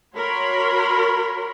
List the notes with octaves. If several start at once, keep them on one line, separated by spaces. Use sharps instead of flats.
F#4 A#4 C#5 B5 C6